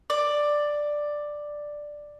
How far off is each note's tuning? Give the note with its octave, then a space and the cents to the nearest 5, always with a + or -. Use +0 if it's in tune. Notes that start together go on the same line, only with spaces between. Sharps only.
D5 +5